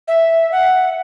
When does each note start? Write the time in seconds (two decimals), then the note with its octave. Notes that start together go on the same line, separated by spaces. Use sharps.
0.08 E5
0.52 F#5